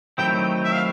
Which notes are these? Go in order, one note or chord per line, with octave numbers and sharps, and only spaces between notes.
D#3 F#3 A3 C4 E4 G5
E5
F5